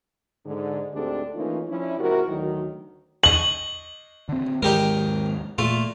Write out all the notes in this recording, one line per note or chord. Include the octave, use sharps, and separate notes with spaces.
G#2 D3
D2 G#2 C4 D4 G4 A4
E3 A3 A#3 C#4 D#4 F4
F3 C#4 D4 E4
G#2 C3 E4 F#4 A#4
D2 D#3 F#3
D#5 C#6 F#7
D3 C4
D#2 G#2 G#3 D#4 G4 A#4
A#2 A3 F4